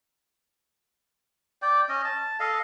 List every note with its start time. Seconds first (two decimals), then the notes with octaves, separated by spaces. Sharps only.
1.62 D5 G5
1.89 C#4 D#5
2.05 A5
2.40 A4 D#5 F5